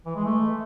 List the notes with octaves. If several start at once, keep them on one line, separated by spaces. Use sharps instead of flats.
E3
G#3
A3